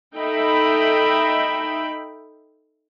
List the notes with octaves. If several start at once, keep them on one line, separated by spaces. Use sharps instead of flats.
D#4 A4 E5 G5 B5